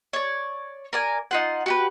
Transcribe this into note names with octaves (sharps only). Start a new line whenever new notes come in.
C#5 D5
A#4 D5 G#5
D#4 F4 F#5
F#4 G4 B4